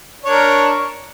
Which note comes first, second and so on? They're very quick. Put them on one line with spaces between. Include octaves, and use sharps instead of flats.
D4 C#5 A#4